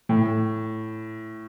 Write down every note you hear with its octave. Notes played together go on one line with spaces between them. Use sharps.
A2